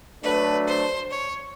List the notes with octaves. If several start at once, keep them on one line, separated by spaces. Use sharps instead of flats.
F#3 A3 D4 B4
C5
C#5